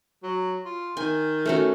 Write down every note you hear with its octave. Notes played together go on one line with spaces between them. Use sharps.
F#3
F4
D#3 G#5
A3 C#4 F#4